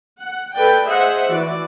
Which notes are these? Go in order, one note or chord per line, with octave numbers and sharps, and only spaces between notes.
F#5
A4 B4 D5 G5
G#4 C5 D#5 E5 F#5
E3 F#4 D5